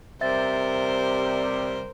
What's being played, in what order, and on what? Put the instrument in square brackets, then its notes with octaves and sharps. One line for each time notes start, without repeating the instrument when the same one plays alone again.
[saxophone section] C3 G3 [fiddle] A#4 C5 [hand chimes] E5 A6